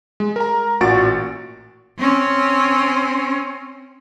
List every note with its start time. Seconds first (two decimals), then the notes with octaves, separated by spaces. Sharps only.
0.20 G#3
0.36 A#4 A#5
0.81 A1 A#2 F#4 C#6 A6 D7
1.98 C4 C#4